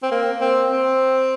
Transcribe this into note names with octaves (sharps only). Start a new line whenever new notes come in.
C4
A#3
C4
C4